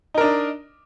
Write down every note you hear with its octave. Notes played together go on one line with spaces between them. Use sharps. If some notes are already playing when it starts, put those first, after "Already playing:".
D4 D#4 A#4 D#5